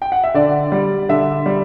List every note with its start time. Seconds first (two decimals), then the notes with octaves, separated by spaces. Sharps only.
0.02 G5
0.12 F#5
0.24 E5
0.34 D3 D5
0.72 G3
1.09 D3 E5
1.46 G3